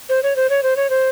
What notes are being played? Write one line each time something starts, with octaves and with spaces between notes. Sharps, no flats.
C5
C#5
C5
C#5
C5
C#5
C5